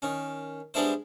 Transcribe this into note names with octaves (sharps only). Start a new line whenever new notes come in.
D#3 C#4
G3 G#3 B3 D4 E4 C5